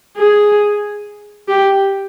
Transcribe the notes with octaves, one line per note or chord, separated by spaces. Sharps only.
G#4
G4